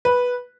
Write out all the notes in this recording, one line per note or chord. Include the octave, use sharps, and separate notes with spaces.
B4